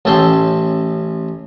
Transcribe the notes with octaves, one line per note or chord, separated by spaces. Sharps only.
A1 A2 C#4 A4 G5 C6